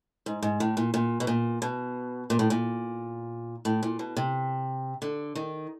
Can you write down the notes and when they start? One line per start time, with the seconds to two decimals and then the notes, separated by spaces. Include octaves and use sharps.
0.26 G#2
0.42 G#2
0.60 A2
0.77 A#2
0.94 A#2
1.20 B2
1.27 A#2
1.62 B2
2.30 A#2
2.39 A2
2.50 A#2
3.65 A2
3.83 A#2
3.99 B2
4.17 C3
5.02 D3
5.35 D#3